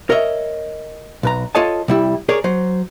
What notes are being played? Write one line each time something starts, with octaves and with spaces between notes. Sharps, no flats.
A#4 C#5 D#5 E5
B1 B4 A#5
F4 A4 C#5 D#5 A5
C3 G3 E4
G#4 A#4 C#5 D5
F#3 C5